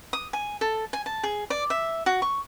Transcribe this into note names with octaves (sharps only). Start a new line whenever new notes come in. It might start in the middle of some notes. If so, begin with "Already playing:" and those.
D#6
G#5
A4
G#5
A5
G#4
D5
E5
F#4
C#6